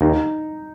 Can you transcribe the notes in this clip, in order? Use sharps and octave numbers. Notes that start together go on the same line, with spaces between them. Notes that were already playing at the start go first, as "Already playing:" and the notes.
D#2 D#4